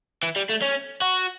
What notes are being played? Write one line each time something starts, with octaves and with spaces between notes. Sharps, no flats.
E3
G3
A3
C#4
F#4